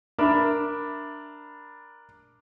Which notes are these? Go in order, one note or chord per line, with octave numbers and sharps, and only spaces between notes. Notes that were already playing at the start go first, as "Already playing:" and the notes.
D4 A#4 E5 B5